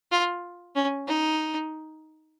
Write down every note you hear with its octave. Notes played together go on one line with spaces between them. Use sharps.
F4
C#4
D#4